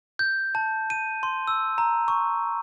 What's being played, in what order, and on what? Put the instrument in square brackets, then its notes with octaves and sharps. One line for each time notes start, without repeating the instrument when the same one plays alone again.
[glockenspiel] G6
A5
D#7
C6
E6
A#5
C#6